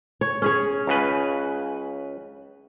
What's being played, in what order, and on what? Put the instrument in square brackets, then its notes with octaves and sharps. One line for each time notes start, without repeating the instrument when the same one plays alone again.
[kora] C#5
C#4 G#4 C#5
[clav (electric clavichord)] C#2 C#3 B4